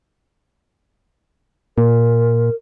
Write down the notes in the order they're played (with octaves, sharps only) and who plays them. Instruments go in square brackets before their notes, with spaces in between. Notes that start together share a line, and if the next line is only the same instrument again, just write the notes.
[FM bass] A#2 [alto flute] A#4